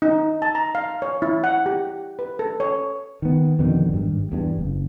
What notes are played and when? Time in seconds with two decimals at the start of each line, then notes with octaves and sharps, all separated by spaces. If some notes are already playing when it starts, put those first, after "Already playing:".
0.02 D#4
0.42 A5
0.55 A#5
0.75 F5
1.02 C#5
1.22 E4
1.44 F#5
1.66 G4
2.19 B4
2.39 A4
2.60 C#5
3.22 D#3 B3
3.59 F2 B2 D3 D#3
3.89 G#1 G2
4.32 E2 G2
4.59 F#1